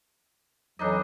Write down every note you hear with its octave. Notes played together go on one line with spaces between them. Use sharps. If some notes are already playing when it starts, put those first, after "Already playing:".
F2 E3 F#3 D4 D#4 D#5